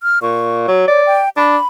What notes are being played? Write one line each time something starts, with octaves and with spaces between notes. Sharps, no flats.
F6
A#2 C#6
F#3
C#5 D5
G5
D4 B5